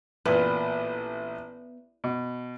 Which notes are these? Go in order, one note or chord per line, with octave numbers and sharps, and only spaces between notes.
A1 A#2 B3
B2